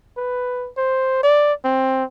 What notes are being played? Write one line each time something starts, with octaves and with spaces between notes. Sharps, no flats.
B4
C5
D5
C4